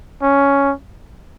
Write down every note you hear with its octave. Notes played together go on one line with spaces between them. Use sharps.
C#4